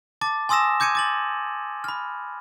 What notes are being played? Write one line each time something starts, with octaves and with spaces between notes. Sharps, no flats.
A5 D6 A6
G#5 C6 D#6 E6 A#6 E7
D6 G6 G#6 C#7 D#7
D6 A6 F#7
B5 F6